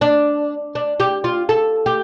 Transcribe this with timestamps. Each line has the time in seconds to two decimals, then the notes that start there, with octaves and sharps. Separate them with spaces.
0.01 D4
0.75 D4
1.00 G4
1.24 F4
1.49 A4
1.86 G4